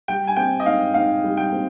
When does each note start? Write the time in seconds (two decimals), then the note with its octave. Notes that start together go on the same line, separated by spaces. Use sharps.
0.08 G3 G5
0.27 G#5
0.36 C4 G5
0.60 D#5
0.66 G#2 F5
0.94 G#2 F5
1.24 G3
1.37 G5
1.52 C4